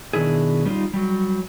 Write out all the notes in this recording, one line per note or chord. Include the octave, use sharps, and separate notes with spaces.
B2 D#3 D4 E4 G#4
G3 B3 C#4 D#4 F4
F#3 G3